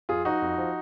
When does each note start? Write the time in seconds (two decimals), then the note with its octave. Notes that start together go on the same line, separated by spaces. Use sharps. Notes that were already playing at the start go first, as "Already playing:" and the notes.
0.09 F2 F4 G#4
0.25 F3 D#4 F#4
0.42 F2
0.58 F3